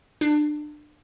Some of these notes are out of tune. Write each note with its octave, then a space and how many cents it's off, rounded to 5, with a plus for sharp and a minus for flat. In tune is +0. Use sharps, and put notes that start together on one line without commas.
D4 +30